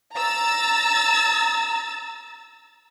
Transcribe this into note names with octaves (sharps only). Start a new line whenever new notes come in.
A#5 E6 A6